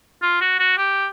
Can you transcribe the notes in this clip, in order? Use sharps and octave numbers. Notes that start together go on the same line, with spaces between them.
F4
F#4
F#4
G4